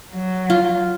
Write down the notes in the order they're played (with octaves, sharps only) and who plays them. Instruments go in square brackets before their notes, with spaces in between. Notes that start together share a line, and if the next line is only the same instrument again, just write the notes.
[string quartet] F#3
[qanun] F4